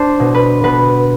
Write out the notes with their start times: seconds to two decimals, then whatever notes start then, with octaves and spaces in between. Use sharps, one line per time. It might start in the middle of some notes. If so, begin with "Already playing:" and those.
Already playing: D4 C5
0.20 B2
0.34 B4
0.63 B2 B4